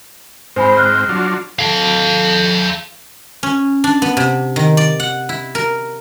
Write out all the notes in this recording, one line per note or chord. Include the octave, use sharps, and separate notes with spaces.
G#2 C4 C5 G#5 B5
F6 F#6
F#3 D4 F4
A4 F5
C#4
D4
B3
C3
D#3
D5
F#5
E4
A#4